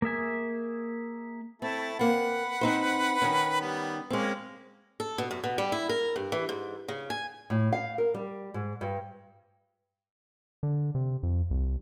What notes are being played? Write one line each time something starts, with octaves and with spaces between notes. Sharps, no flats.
A#3 G#4 E5 G#5
A3 C4 E4 A5
A#3 C4 B4 F#5
C4 D#4 C5
D#3 C#4
G3 B3
G#3 A#3 C4 C#4
A4
B2
F#2
B2
G3
E4
A#4
G2
E3
G#2
C#3
G#5
A2
F5
A#4
G3
G#2
G2
D3
C3
F2
C2